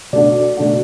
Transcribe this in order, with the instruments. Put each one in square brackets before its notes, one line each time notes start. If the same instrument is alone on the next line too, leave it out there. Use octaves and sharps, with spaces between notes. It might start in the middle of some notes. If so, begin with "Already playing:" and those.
[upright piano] B2 A3 D4 F#4 [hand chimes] D5
[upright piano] B2 A3 D4 F#4